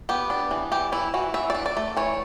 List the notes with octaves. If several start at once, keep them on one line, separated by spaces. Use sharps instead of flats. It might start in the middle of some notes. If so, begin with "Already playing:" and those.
B3 G4
D4
E3
E3 G4
E3 E4
E3 F#4
E3 E5
D5
D4
D5
A3
E3 C#5